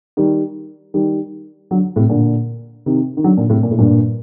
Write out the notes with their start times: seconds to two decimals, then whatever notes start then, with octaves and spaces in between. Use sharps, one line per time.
0.17 D#3 G3
0.94 D#3 G3
1.71 D3 F#3
1.96 A2 C3
2.09 A#2 D3
2.86 C3 D#3
3.17 D#3
3.24 D3 F#3
3.37 A#2 D3
3.50 A2 C3
3.63 A#2
3.71 A2
3.78 G2 A#2